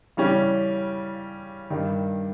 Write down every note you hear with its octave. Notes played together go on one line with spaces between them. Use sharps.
C#3 E3 G3 C#4 G4
G2 D#3 G3